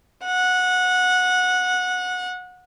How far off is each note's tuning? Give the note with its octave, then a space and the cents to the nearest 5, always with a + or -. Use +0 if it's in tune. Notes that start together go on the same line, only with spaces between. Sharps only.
F#5 -20